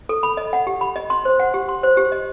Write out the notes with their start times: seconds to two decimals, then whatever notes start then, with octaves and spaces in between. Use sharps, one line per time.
0.09 A4
0.23 B5
0.37 D#5
0.53 F#5
0.67 G4
0.81 B5
0.96 D#5
1.10 C6
1.25 C5
1.40 F#5
1.54 G4
1.69 C6
1.83 C5
1.97 G4
2.12 D#5